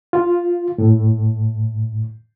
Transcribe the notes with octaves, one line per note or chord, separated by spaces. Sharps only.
F4
A2